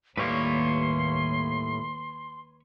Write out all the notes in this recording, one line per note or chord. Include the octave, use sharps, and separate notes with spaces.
D#2 A2 G3 A#3 B4 C#5 C6